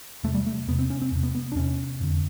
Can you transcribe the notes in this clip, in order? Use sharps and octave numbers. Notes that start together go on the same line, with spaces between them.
E2 C3 A3
G3
A3
E2 C3 B3
C4
C#4
C4
E2 C3
B3
B3
D4
E2 C3 C#4
F2 D3